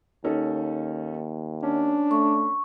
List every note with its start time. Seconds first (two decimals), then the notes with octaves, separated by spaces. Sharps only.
0.24 D#2 C#4 D#4 A4
1.63 C#4 D4
2.11 A3 C#6